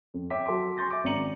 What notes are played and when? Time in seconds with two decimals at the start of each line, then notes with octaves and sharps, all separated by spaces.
0.14 F2
0.30 C#5 E5 G5 D6 B6
0.46 F#3 A4 C6 D6
0.77 G#5 C6 C#6 G6 A6 A#6
0.90 E5 D6
1.04 G#1 C#4 D5 A#5 C#7 F#7